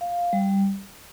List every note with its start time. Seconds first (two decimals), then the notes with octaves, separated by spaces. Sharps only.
0.01 F5
0.33 G3